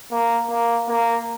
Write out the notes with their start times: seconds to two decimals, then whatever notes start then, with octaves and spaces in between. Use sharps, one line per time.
0.11 A#3
0.50 A#3
0.89 A#3